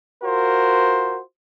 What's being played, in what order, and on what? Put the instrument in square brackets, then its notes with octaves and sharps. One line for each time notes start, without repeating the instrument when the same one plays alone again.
[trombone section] F4 F#4 A#4 C5